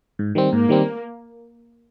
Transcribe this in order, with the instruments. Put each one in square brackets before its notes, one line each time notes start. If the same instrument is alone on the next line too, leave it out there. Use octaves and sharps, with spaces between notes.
[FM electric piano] G#2
D#3 G3 C4
[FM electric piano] G#2 [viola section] A#3
[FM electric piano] D#3 G3 C4